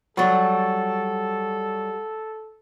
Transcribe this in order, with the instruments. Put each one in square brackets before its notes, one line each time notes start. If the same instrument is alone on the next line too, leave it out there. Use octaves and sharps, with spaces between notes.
[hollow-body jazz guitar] F#3 G3 [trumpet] A4 [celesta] F#5 C#6 A6